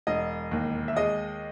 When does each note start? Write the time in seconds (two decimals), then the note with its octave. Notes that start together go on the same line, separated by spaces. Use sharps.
0.07 E1 D#5
0.51 D#2
0.88 E5
0.96 G#3 D#5